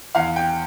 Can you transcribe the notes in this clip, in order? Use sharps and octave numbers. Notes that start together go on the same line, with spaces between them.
E2 F5
G5